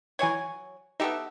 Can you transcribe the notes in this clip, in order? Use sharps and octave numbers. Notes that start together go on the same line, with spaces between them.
E3 F#3 C#5 G#5 G#6
B3 D#4 G4 A4 E5